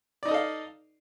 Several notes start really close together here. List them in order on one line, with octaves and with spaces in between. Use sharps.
D5 D#4 D#5 A4 F5